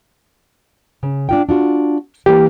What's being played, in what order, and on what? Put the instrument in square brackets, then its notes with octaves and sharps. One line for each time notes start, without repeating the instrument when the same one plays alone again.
[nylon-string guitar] C#3
D4 F4 G5
D4 F4 F#4
[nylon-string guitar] E3 A#3 [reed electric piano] G4